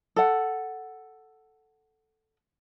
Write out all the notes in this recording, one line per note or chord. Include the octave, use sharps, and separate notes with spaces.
A4 F#5